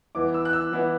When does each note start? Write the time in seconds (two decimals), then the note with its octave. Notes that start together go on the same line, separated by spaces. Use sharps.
0.15 E3 B3 E4 D6
0.34 E6
0.45 F#6
0.53 E6
0.72 E3 B3 E4